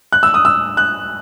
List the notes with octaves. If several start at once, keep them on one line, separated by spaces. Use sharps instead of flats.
F#6
E6
D#6
E6
F#6